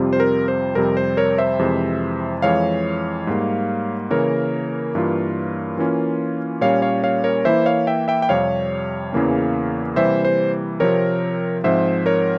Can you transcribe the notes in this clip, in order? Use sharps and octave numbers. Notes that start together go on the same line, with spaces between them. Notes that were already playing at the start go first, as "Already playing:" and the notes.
Already playing: F2 C3 G3 C4 F4
C5
A#4
C5
F2 C3 G3 C4 A#4
C5
A#4 C#5
C5 E5
F2 C3 E3 G#3
F2 E3 G#3 C#5 F5
G#2 G3 A#3
C#3 E3 A#3 A#4 C#5
G2 E3 A#3 F4
E3 A#3 C#4 F4
A#2 G3 A#3 C#4 C#5 F5
C#5 F5
C#5 F5
A#4 C#5
E3 A#3 E4 C5 E5
C#5 F5
E5 G5
E5 G5
G5
F2 C3 G3 C#5 F5
E2 C#3 E3 A#3 C#4
C3 E3 G3 A#3 C5 E5
C5
C3 F3 C4 A#4 C#5
G#2 F3 C4 C5 E5
A#4 C#5